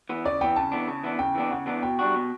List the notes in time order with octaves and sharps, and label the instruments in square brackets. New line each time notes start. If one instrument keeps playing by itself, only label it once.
[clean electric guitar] E3 B3
[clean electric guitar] C#3 [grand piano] D5
[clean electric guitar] E3 B3 [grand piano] G5
[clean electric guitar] C#3 [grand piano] A5
[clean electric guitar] E3 B3 D4
C#3
E3 B3 D4
[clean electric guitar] C#3 [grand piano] G5
[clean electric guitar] E3 B3 D4
[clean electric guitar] C#3 [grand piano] F#5
[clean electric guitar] E3 B3 D4
[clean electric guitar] B2 [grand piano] G5
[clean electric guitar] G3 D4 F#4
B2